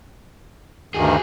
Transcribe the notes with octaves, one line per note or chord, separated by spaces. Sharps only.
D2 G2 D#3 F#4 G#4